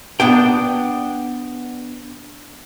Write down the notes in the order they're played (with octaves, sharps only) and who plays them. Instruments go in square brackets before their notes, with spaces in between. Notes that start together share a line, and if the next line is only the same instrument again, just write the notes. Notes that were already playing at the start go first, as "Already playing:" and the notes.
[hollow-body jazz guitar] B3 D4 G5